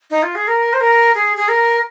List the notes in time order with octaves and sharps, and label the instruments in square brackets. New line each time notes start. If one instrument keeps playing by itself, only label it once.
[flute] D#4
F4
G#4
A#4
C5
A#4
G#4
G#4
A#4